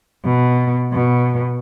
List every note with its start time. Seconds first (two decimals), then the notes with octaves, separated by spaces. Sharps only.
0.24 B2
0.93 B2